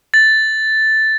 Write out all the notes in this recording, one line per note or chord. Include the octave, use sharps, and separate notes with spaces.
A6